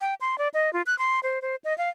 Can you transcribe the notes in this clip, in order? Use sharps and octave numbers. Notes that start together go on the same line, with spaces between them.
G5
C6
D5
D#5
F4
F#6
C6
C5
C5
D#5
F5